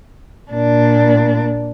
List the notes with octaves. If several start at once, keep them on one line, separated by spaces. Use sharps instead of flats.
A#2 D4